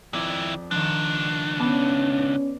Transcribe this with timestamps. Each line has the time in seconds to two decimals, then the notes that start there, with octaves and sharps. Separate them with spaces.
0.13 F2 D#3 E4 D5
0.71 C#2 D#3 F3 D4
1.60 B3 C#4 D5 A5